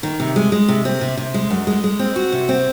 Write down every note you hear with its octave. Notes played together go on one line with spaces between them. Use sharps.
D#3
C3
G#3
G#3
C3
C4
C3
C3
G#3
F#2
G#3
G#3
C4
F#4
C3
C4